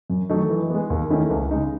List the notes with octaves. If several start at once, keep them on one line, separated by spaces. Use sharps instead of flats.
F#2
D#3 F#3 A3 D#4
E3
G#3 B3
D#2
D#3 A3 C#4 E4
C#2
C#3 G#3 D#4